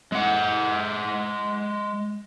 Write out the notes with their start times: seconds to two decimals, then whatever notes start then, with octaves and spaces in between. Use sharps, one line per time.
0.12 G#3 F#5